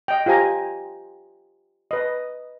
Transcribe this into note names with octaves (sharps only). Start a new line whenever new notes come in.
D#5 G5
F4 G4 C5 G#5 A#5
B4 D#5